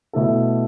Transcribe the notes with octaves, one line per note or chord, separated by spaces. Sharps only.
B2 A3 E4 A4